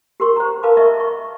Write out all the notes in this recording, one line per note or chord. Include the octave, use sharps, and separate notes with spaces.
G4 A#4 C6 C#6
C5 A#5
A#4 B4 F5 A5 B5 D6
A#4 D#5 E5 C#6
C#6